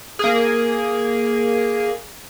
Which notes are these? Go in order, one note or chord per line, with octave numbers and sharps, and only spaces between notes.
A#3 G#4